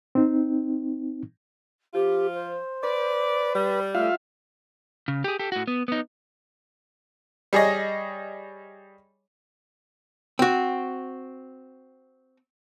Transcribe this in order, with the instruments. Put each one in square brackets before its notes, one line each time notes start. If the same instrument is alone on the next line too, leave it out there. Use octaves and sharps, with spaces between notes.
[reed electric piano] C4 D#4
[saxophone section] F3 F4 [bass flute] G4
[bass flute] C5
[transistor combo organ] B4 [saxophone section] D5
[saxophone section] G3
[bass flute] A3 [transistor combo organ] F4 E5 F5
[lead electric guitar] C#3
G4 G#4
G4 A4
A2 F#4
B3
B3 D#4
[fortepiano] G3 G#4 C#5 D#5
[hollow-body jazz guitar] C4 F#4